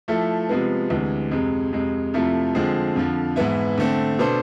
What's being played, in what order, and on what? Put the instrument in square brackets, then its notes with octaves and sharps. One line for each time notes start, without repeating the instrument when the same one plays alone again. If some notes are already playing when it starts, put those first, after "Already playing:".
[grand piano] F3 A3 E4 A4
C3 F3 G#3 B3
D2 C3 E3 G#3
F2 C3 G#3
F2 C3 G#3
F2 C3 F3 A3 E4
D3 F3 G#3 C4 G#4
F2 D3 F3
G#2 E3 B3 E4
D3 A3 C4
B2 B3 D4 A4 C5